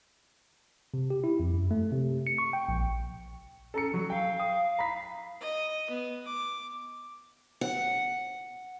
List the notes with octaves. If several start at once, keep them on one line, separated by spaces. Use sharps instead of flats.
C3
G4
E4
F2
F#2
A3
C3
C#7
C#6
G5
A#1
C#4 A4 A#5 C#7
F#3 G3
F5 G5
D#6
A#5 B5 B6
D#5
B3
D6
F#5